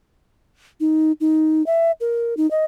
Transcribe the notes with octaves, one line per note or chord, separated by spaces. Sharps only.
D#4
D#4
E5
A#4
D#4
D#5